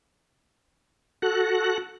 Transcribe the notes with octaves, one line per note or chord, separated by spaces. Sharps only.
F#4 A4 F#6